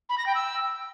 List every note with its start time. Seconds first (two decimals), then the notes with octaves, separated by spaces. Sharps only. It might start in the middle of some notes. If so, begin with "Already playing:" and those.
0.09 B5
0.18 A#6
0.26 G5
0.35 E6